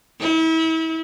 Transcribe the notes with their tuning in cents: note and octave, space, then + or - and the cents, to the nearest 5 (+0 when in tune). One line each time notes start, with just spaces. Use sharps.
E4 -35